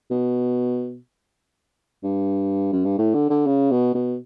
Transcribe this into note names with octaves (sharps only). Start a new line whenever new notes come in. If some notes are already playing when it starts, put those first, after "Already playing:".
B2
G2
F#2
G2
A2
D3
D3
C#3
B2
B2